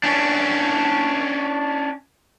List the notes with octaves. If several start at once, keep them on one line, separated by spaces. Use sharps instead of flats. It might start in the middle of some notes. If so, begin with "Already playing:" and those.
C#4 D4